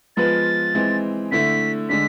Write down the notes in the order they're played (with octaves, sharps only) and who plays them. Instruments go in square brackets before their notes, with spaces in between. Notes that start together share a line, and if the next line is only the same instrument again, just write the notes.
[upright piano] F3 G#3 B3 F4 B4 [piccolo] A6
[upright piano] E3 G#3 C4
[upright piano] D3 A3 E4 [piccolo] B6
[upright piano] D3 G#3 D4 [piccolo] B6